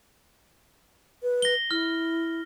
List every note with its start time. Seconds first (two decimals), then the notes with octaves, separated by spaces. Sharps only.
1.23 B4
1.42 A#6 G7
1.71 E4 F6